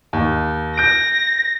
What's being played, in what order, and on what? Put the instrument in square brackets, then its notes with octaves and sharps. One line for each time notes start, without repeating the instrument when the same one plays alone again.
[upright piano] D#2
[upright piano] G6 D7 [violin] A#6